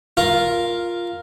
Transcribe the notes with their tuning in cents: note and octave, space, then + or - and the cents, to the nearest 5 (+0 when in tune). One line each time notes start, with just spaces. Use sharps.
F4 +0 A#4 +5